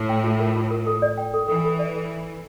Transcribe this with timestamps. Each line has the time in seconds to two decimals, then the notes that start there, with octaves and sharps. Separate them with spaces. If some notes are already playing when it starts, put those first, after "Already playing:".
Already playing: A2
0.09 G5
0.24 F4
0.40 A#4
0.56 F4
0.71 A#4
0.87 A4
1.02 D5
1.18 G5
1.34 A4
1.48 E3 A4
1.65 A4
1.79 D5
1.95 A4